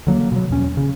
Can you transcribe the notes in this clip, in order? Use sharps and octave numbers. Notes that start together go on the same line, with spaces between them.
D3 F#3 A#3
B2 F#3
E2 C#4
C#3